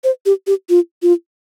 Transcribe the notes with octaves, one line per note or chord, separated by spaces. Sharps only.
C5
G4
G4
F4
F4